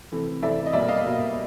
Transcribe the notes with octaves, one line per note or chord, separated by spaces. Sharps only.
C3 E3 A3
C3 E3 A3 D5 E5
D#5
B2 G3 A#3 D5 E5
D#5 F5
B2 G3 A#3